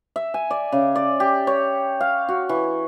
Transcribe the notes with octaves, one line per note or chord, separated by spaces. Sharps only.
E5
G#5
D5
C#3
D5
G4
C#5
F5
F#4
E3